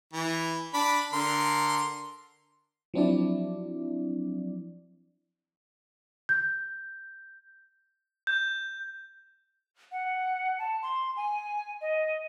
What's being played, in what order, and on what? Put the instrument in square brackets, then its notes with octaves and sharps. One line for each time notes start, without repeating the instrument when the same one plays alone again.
[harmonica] E3
D4 B5
D3 A#4 C6
[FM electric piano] F3 F#3 C4 D4 E4 D5
[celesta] G6
[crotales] G6
[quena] F#5
A5
C6
G#5
D#5